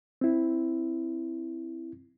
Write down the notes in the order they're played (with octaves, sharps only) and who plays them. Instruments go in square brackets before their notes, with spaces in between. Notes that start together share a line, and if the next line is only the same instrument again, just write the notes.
[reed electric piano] C4 E4